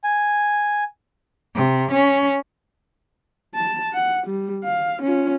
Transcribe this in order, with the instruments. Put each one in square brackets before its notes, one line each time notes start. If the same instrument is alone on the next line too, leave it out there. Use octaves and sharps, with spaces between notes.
[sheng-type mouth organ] G#5
[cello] C3
C#4
[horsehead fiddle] A5
F#5
G3
F5
C#4 F4